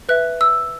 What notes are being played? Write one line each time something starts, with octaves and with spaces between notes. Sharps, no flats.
B4 E5 F#6
E6